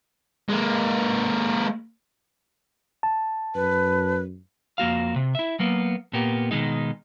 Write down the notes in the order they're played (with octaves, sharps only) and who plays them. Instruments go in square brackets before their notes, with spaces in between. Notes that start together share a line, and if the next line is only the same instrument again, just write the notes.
[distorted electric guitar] G#3 A#3
[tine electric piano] A5
[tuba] F#2 [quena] B4
[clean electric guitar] F2 A#3 F#4 F5
C3
E4 E5
F#3 A#3 B3
A#2 A#3 B3 G4
B2 D#3 G#3 D#4